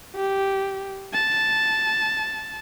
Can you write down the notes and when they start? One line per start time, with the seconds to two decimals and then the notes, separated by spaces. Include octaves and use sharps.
0.16 G4
1.14 A5